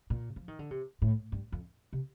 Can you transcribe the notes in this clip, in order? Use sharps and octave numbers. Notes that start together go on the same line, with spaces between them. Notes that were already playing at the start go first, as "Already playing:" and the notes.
A#2
F3
D#3
D3
C3
A2
G2
F2
C3